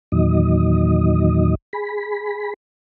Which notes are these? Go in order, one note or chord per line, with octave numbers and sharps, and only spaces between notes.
E2 A#2 D#3 F#3 D#5
G#4 B5